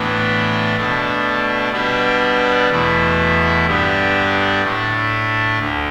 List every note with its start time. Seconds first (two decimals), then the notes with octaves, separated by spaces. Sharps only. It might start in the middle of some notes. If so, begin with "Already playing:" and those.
Already playing: A2 E3 B3 D4
0.76 B2 A3 D4
1.72 B2 G3 B3 D4
2.69 E2 B2 A3 E4
3.66 G2 D3 G3 B3 D4
4.62 A2 A3 D4
5.59 D2 D3